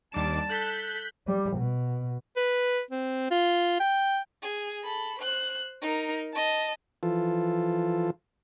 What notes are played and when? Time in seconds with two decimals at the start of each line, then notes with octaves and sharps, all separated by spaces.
0.12 D#2 G3 D4 A5 D6 E7
0.49 A4 F#6 G6 B6
1.27 G3
1.57 B2
2.37 B4
2.91 C4
3.31 F4
3.80 G5
4.43 G#4
4.84 A4 B5
5.19 C5 F#6
5.81 D#4 A#4
6.33 D#5 A5
7.03 E3 F3 F4 A4